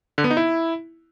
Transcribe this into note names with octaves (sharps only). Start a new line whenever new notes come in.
D3
B3
D#4
E4